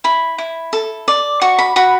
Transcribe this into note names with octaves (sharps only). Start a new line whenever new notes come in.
E4 B5
E4
A4
D5
F#4 C#6
B5
F#4 B5